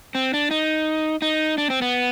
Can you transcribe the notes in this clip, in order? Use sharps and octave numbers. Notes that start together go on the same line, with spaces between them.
C4
D4
D#4
D#4
D4
C4
B3